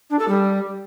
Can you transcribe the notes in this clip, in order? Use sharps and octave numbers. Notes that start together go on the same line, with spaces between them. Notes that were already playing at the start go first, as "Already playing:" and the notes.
D4
A4
G3